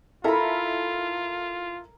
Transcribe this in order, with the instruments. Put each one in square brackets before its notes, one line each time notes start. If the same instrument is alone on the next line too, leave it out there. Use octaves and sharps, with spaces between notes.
[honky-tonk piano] E4 A4 E5 [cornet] F4 [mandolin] A#4 B5